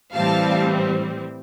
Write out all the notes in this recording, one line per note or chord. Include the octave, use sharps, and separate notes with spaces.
A2 E3 G3 C4 F5 A5